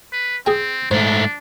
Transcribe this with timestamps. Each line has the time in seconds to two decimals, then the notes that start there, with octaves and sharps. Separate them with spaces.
0.12 B4
0.46 C4 G#4 G5
0.91 G#2 A3 D4 C5